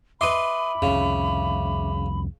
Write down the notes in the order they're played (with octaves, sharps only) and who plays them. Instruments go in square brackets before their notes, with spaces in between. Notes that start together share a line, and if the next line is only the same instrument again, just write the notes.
[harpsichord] B4 D#5 C6 [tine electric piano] E5 D6 [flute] B5
[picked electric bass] C2 F2 [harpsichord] C#3